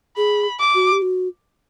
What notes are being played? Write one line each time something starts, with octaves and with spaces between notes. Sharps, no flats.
G#4 B5
D6
F#4
G4
F#4